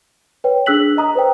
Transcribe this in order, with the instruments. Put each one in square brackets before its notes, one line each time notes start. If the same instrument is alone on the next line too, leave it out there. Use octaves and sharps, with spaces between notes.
[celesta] B4 C#5 G5
D4 G#4 E6 F#6 B6 F#7
D#5 A#5 D#6
B4 C5 D5 G5